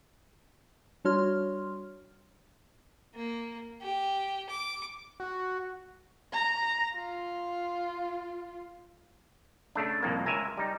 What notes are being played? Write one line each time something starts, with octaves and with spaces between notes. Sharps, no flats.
G3 D4 F#4 C#5 C6 F6
A#3
G4
D6
F#4
A#5
F4
C#3 A3 D4
C2 F2 A2 A#3
C#2 A#4 E5 G#5 A#5
G3 D#4